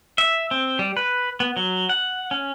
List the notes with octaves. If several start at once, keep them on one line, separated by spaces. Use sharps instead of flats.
E5
C4
G3
B4
B3
F#3
F#5
C#4